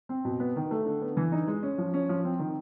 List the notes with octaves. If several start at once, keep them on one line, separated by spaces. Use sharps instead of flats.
C4
B2
B3
D#3
A3
D3
B3
E3
D#4
G#3
C#4
F3
C#4
F3
C4
D#3